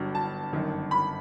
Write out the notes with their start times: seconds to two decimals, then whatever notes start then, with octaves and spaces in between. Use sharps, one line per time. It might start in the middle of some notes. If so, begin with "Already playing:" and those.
Already playing: G1 G2 F#3
0.15 A5
0.53 G1 F#2 D#3
0.91 B5